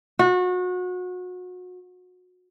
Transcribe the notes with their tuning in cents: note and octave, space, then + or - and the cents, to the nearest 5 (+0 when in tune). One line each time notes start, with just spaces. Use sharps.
F#4 -30